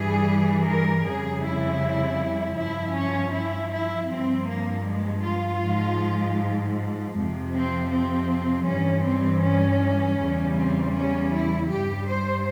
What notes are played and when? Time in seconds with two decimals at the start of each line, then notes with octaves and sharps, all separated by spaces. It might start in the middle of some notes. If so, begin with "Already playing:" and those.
Already playing: G2 E3 G3 G#4
0.67 A#4
1.05 F2 C#3 G3 G#4
1.43 E4
2.57 G2 F3 E4
2.95 C#4
3.33 E4
3.71 E4
4.09 G2 F3 C4
4.48 A#3
4.86 G#3
5.24 F4
5.62 G#2 F3
7.14 F2 C3 F3
7.52 C4
7.90 C4
8.66 G2 E3 G3 C#4
9.04 C4
9.43 C#4
10.19 E2 C#3 G3
10.57 C4
10.94 C#4
11.33 E4
11.71 G2 G3 G4
12.09 C5